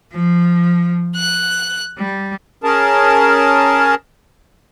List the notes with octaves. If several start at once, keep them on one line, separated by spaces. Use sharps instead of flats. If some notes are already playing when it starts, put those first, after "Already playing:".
F3
F#6
G3
C#4 G#4 A#4 A5